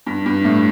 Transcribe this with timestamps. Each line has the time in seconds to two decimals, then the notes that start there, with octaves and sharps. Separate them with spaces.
0.06 G2
0.26 G2
0.45 A2